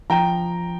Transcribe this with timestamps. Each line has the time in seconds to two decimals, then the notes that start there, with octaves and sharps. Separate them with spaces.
0.10 F3 G5 A#5